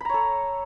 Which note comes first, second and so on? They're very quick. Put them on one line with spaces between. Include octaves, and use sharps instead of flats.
B5 A#5 C#5 A4